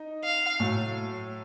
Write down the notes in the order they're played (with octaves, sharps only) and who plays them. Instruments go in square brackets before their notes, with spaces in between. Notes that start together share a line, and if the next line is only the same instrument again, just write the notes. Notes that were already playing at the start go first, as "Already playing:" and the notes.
Already playing: [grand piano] D#4
[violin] F5
[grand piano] A2 F#3 A3